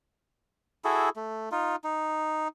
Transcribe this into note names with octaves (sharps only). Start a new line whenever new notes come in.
E4 F#4 G#4 A4
A3
D#4 F4
D#4